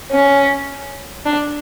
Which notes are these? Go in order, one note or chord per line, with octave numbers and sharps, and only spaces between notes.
C#4
D4